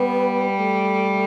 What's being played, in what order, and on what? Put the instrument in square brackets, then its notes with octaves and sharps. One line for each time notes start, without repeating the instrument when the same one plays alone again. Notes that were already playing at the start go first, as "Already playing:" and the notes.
Already playing: [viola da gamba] G3 [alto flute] B3
[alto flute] A3